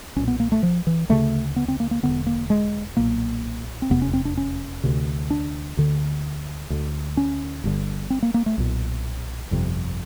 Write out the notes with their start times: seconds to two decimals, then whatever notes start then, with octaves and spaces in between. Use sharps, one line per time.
0.16 B1 A#2 C#4
0.28 B3
0.40 A#3
0.52 A3
0.63 F3
0.87 E3
1.09 D2 C#3 A3
1.56 B3
1.68 C4
1.80 A#3
1.91 A#3
2.03 E1 D#2 D3 B3
2.27 A#3
2.50 G#3
2.97 B1 A#2 A#3
3.82 C4
3.90 F1 E2 C3 B3
4.02 C#4
4.13 C4
4.25 D4
4.37 C#4
4.84 D2 C3
5.30 D4
5.77 D2 D3
6.70 D2 D3
7.17 C#4
7.64 G1 G2 D3
8.10 C4
8.23 A#3
8.34 A#3
8.46 A3
8.58 B1 A#2
9.51 G1 F2 C3